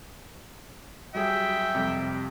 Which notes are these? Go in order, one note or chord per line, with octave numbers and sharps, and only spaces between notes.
F#3 G3 G#4 E5 G5
F2 C3 G3